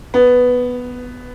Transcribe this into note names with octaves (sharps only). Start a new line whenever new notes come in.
B3